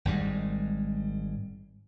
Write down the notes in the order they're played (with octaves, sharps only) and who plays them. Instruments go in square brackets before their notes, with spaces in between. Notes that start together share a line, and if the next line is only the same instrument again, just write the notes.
[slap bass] G#1 G#2 G3 G#3